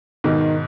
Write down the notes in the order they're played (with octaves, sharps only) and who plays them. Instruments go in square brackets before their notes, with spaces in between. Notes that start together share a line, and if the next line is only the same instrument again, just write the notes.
[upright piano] G#2 B2 [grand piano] D#3